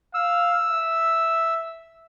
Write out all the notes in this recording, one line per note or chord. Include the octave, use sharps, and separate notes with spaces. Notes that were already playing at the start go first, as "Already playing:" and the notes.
F5 E6
E5